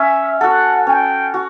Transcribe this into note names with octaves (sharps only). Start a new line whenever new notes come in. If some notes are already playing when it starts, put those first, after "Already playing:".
Already playing: C#4 E5
F#4 A4 F#5
C#4 G5
F#4